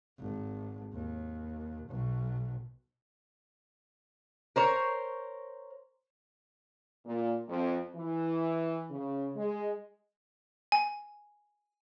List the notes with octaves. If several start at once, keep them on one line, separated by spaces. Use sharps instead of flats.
G#1
D#2
B1
A#4 C5 C#5
A#2
F2
E3
C#3
G#3
G#5